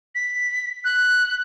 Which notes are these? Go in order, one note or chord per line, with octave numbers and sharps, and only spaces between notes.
B6
F#6